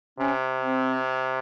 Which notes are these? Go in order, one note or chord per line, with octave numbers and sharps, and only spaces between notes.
C3 C#4
C4